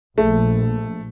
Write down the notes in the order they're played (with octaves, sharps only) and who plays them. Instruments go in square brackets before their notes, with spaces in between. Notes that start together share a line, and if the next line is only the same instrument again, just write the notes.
[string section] A#1 [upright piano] A3